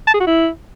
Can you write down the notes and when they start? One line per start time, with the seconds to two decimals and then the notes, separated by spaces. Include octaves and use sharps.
0.07 A5
0.14 G#4
0.20 F#4
0.27 E4